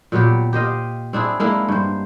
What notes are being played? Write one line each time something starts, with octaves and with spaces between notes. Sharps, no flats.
A#2 F#3 B3 G4
G4 C5 D#5 F5
C4 D4 E4 G#4
G#3 A#3 D4 E4
G2 C5